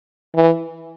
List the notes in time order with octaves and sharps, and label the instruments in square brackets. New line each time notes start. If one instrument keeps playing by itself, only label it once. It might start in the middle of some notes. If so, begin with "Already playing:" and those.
[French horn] E3